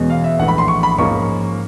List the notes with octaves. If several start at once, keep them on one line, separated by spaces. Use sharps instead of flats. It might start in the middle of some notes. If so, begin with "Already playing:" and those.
Already playing: E2 B2 G#3 C#4
F5
E5
A#1 A2 E3 F#5
B5
C6
C#6
B5
G#2 F3 A#3 C#4 C#6